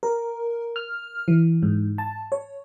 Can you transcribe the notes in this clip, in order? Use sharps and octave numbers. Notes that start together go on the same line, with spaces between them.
A#4
F6
E3
G#2
A5
C#5